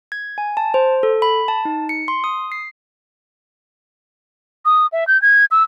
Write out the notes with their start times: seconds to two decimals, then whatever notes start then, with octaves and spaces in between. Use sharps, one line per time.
0.12 G#6
0.38 G#5
0.57 A5
0.74 C5
1.03 A4
1.22 B5
1.48 A5
1.65 D#4
1.89 C#7
2.08 C6
2.24 D#6
2.52 C7
4.65 D#6
4.92 E5
5.07 G6
5.22 G#6
5.51 E6